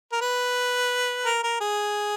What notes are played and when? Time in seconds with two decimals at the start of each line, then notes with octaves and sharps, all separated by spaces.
0.12 A#4
0.21 B4
1.25 A#4
1.43 A#4
1.60 G#4